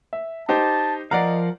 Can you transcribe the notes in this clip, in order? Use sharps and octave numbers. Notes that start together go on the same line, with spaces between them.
E5
D#4 G4 C5 A5
F3 A#4 D5 D#5 F5 F#5 A#5